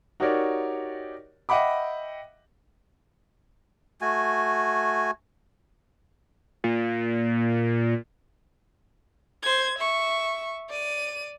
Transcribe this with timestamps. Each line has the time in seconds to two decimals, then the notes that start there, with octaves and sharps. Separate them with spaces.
0.20 D#4 F#4 G4 A#4 C#5 D5
1.49 D#5 E5 F#5 G5 B5 D6
4.01 A3 F#4 G#5
6.64 A#2
9.43 C5 G#6
9.79 E5 C#6
10.70 D5 D#7